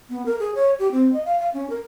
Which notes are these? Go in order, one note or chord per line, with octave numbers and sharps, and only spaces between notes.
B3
A#4
G#4
C#5
G4
C4
D#5
F5
F5
C#4
A#4